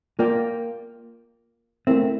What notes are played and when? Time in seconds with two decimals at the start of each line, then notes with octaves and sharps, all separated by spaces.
0.19 A#3 F4 A#4 D5 G5
1.87 A3 C4 E4 A#4 E5